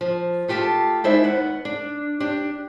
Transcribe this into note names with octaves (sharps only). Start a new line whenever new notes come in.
F3
A3 F4 G4 F5 A5
G#3 D#4 E4 C5 D5 E5
D#2 B3 F#5
D4
D4 G4